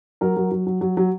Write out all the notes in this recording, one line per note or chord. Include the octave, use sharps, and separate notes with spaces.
F#3 A#4
F#3
F#3
F#3
F#3
F#3